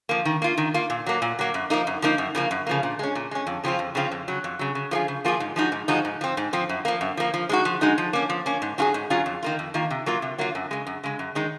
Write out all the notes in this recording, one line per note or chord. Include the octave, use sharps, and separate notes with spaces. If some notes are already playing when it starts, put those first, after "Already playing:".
F3 A#3
D#3
A#3 F4
D#3
A#3 F4
A#2
F#3 A#3
A#2
F#3 A#3
F#2
F3 A#3 D#4
F#2
F3 A#3 D#4
F#2
C#3 F3 A#3
F#2
C#3 F3 A#3
A#2
G#3 C#4
A#2
G#3 C#4
F2
C#3 F3 C4 F4
F2
C#3 F3 C4 F4
F2
C#3 F#3
F2
C#3 F#3
C#3
F3 A#3 F4 G#4
C#3
F3 A#3 F4 G#4
G#2
F3 G#3 D#4 F#4
G#2
F3 G#3 D#4 F#4
G#2
F3 C4
G#2
F3 C4
F#2
F3 A#3
F#2
F3 A#3
F3
G#3 D#4 F#4
F3
G#3 D#4 F#4
F3
A#3 C#4
F3
A#3 C#4
G#2
F#3 C#4 F4 G#4
G#2
F#3 C#4 F4 G#4
F2
D#3 A#3 F4
F2
D#3 A#3 F4
C3
F#3 A#3 F4
C3
F#3 A#3 F4
F#2
C#3 G#3
F#2
C#3 G#3
F#2
D#3 G#3 D#4